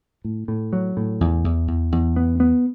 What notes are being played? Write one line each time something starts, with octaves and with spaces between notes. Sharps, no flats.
A2
A2
F#3
A2
E2
E2
E2
E2
B3
B3